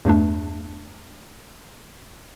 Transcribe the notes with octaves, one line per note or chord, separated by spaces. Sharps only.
E2 G2 A3 D4